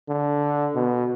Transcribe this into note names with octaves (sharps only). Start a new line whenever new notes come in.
D3
B2